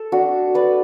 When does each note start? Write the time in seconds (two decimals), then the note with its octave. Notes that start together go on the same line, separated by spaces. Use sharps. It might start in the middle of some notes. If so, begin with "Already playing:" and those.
Already playing: A4
0.12 D4 F#4
0.55 B4 D5